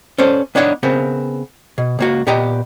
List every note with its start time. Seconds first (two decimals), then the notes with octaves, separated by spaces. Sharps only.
0.18 C#4 A4 C5 D5
0.55 B3 D4 D#4 C#5 D5 F#5
0.83 C#3 B3 C4 A#4
1.78 B2
1.99 C#2 A#3 F#4
2.27 A#2 B3 G4 D#5 A#5